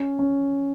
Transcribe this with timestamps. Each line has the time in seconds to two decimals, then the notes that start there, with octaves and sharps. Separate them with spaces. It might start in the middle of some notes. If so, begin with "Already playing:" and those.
Already playing: C#4
0.19 C#4